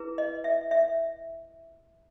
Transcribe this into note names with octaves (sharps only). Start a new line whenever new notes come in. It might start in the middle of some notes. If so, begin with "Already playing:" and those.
Already playing: E4 G#4 B4
D#5
E5
E5